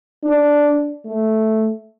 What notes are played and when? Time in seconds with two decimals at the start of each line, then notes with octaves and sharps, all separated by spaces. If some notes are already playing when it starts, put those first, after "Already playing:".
0.24 D4
1.06 A3